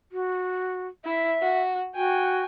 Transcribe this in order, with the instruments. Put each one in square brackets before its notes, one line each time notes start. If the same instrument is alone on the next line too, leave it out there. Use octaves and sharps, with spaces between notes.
[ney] F#4
[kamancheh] E4 [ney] E5
[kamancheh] F#4
[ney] F#4 [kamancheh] G5 G#5